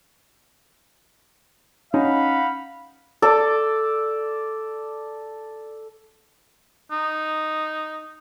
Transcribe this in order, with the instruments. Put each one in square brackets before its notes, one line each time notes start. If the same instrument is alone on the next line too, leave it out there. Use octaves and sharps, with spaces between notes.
[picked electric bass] C#4 [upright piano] D#4 [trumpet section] F5 F#5 B5
[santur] A4 D5
[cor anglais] D#4